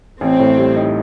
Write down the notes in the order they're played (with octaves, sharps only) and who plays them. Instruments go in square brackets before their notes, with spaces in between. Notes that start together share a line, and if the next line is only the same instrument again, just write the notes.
[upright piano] A1 [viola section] C4
[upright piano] A2
G3
D#4